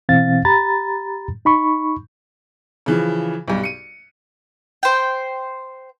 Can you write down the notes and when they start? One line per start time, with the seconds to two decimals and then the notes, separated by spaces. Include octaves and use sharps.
0.09 B2 E3 C4 F5 A6
0.45 G4 A#5 B5 A6
1.45 D#4 B5 C#6
2.86 C#3 E3 F3
3.48 B1 G2
3.63 C#7 D#7
4.83 C5 G5